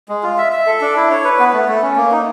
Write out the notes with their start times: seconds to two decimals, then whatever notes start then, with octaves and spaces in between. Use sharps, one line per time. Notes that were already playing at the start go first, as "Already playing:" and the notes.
0.09 G#3
0.23 F4
0.38 E5
0.52 E5
0.67 A4
0.81 D4
0.96 E4
1.11 C#5
1.24 B4
1.39 B3
1.53 A3
1.69 A3
1.82 C#4
1.96 A#3
2.12 D#4